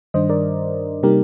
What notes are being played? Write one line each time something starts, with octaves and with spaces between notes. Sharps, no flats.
G2 D#3 G3 D4 C5 D#5
A#4 D5
C3 G3 A#3 D#4 G4 A#4